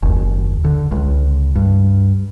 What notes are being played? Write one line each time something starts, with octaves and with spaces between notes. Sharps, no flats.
F#1 D#2
D3
C#2
G2